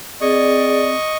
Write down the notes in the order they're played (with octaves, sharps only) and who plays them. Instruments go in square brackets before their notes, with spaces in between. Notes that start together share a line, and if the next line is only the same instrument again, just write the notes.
[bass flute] C4 [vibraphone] G#4 [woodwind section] D5 [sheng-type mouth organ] D#5 C#6